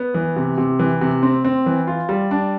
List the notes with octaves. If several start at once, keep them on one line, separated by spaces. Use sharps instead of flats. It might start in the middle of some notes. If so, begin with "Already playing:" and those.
Already playing: B3
E3
C3
C3
E3
C3
C4
C4
E3
F4
G3
D4